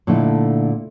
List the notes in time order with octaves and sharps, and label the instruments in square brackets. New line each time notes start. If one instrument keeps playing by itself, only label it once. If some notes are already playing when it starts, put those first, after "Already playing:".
[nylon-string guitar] A#2 D3 A3 D#4 E4